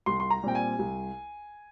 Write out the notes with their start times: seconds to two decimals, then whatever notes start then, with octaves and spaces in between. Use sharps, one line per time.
0.06 C2 C6
0.20 C6
0.30 A#5
0.43 A#2 G3 C4 G5
0.55 G#5
0.79 C2